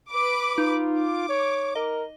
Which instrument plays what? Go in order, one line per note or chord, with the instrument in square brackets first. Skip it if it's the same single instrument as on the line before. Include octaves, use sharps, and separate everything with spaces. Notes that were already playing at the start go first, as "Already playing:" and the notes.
[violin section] B4 D6
[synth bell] D#4 [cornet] F4
[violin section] D6
[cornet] C#5
[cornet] A#4 [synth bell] D#5